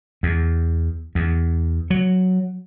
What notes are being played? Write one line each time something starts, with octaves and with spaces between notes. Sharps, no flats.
E2
E2
F#3